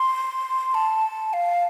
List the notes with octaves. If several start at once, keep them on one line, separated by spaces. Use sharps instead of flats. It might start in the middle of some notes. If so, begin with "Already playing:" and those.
Already playing: C6
A5
F5